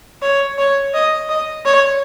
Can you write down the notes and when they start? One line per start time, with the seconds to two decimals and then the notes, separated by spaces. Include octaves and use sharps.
0.22 C#5
0.58 C#5
0.94 D#5
1.29 D#5
1.65 C#5